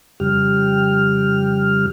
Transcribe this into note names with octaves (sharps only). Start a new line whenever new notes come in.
F2 C#3 G3 G4 F6